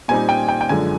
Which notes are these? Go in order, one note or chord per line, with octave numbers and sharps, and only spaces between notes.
A#2 G3 C4 D#4 G#5
G5
G5
G5
F#2 D3 F3 G#3 G#5